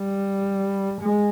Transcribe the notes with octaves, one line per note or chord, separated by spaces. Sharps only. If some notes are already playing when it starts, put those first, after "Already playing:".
Already playing: G3
G#3